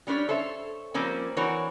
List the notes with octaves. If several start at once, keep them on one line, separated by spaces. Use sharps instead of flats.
G3 C#4 D4 C5 C#5
A4 C5 C#5 E5
F3 G3 A#3 C4 C#4
E3 C4 D4 F#4 A#4 C#5